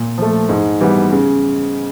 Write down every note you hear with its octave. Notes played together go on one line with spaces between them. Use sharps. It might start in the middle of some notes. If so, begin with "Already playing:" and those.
Already playing: A#2
F3 A3
G#2
E3 G3 B3
C#3